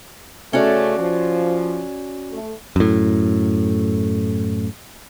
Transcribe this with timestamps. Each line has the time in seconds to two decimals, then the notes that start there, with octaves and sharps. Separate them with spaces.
0.53 C#3 A3 C#4 F#4 D5
0.98 F3
2.31 A3
2.76 F#2 A2